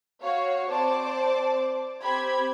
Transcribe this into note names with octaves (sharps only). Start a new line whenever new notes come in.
F#4 C#5 F5
C4 C5 D5 A5 D6
C4 G4 C5 B5 G#6